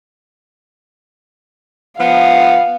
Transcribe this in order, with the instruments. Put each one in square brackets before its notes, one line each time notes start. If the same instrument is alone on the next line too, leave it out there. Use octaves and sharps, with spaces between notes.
[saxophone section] F3 B3 [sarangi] F5